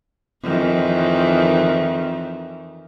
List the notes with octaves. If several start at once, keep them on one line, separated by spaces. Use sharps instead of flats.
F2 D#3 E3